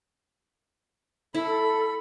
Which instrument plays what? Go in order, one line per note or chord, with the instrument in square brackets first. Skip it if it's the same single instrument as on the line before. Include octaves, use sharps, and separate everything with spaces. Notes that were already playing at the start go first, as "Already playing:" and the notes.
[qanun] E4 [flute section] A4 [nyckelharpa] B5